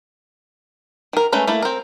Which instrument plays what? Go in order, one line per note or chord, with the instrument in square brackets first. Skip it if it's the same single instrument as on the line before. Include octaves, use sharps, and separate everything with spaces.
[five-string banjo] D#3 A#4
G#3 A3 C#4 B4 A#5
A3 A#3 E4
C4 A#4